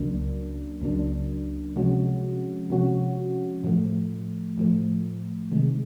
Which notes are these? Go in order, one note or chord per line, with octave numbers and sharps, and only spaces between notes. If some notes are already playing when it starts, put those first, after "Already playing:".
Already playing: C#2 C#3 F#3 A#3 D4
C#2 C#3 F#3 A#3 D4
C3 F3 G#3 C#4 F#4
C3 F3 G#3 C#4 F#4
A2 F3 A3
A2 F3 A3
C3 D#3 G#3